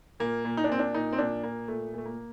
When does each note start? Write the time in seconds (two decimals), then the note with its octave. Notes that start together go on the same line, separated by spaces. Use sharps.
0.20 A#2 A#3
0.45 A#2
0.57 D#4
0.64 D4
0.69 A#2 C4
0.79 D4
0.94 A#2 D#4
1.13 C4
1.18 A#2 D4
1.43 A#2 A#3
1.68 A#2 A3
1.93 A#2 A3
2.06 A#3